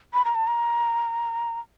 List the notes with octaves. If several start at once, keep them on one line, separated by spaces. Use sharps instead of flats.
B5
A#5
A5
A#5